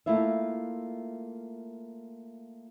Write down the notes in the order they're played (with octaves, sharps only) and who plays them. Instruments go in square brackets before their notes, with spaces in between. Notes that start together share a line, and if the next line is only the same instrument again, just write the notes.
[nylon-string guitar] A3 A#3 E4 F4 E5